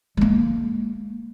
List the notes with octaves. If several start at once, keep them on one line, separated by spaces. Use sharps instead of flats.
G#3 A#3